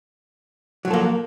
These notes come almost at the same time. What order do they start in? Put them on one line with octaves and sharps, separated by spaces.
F#3 F3 A4 A#3